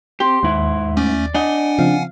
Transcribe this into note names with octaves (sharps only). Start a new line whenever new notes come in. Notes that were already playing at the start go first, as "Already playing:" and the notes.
C4 G4 C5
D#2 G#2 E4
A3 C#4 D5
D4 D#5 F#5 G#5
C#3 F3 C4 F5